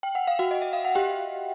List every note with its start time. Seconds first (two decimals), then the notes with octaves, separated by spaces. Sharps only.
0.03 G5
0.15 F#5
0.27 F5
0.39 F#4 F#5
0.51 D#5
0.62 E5
0.73 F5
0.85 F#5
0.95 G4 G5